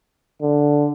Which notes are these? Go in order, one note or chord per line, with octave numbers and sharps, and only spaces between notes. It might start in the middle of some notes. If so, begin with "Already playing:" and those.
D3